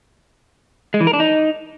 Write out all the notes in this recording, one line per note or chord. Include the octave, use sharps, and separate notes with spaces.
G#3
E3
A#4
D4
D#4